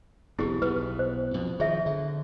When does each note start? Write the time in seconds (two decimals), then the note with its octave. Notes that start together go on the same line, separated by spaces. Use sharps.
0.39 F1 D2 B3 E4 G4 G#4
0.62 B1 B3 B4
0.99 C5
1.34 F2 B2
1.60 D#3 F3 G#4 C#5 E5
1.86 D3